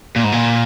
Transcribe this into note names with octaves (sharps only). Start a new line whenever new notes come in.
A#2
G#2
A#2